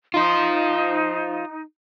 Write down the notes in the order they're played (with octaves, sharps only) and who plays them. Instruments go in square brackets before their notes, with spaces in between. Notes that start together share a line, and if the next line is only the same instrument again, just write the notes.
[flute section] D#4 [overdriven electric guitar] F4 C5